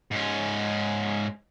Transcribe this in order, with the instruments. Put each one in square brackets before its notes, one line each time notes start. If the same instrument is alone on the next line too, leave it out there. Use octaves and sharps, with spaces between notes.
[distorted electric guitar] G#2 C#4